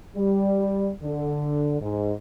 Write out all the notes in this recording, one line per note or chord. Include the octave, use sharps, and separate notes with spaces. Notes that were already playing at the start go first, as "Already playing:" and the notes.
G3
D3
G#2